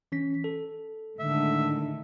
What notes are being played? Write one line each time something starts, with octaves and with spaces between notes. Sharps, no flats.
E3 C#4 B6
A4
A2 D3 D#3 G#3 E5